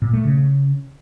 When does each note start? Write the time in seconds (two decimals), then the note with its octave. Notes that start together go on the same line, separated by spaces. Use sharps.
0.02 A#2
0.13 A3
0.25 C#3